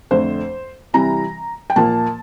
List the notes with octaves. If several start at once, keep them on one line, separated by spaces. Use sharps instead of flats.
F2 D3 A3 C5
C3 E3 G3 A#5
G5
A#2 F3 A#3 A5